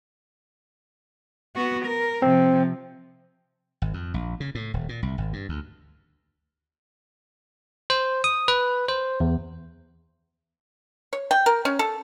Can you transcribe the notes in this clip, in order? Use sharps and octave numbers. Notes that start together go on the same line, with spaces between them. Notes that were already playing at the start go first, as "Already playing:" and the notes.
B3 F#4
A#4
C3 F3 C4
G#1
F2
A#1
C#3
A2
D#1
A#2
C2
G#1
G2
D2
C5
D#6
B4
C5
E2
C#5
G5
A#4
C#4
A4